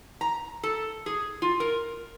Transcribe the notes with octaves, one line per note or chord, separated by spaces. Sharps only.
A#5
A4
G#4
F4
A#4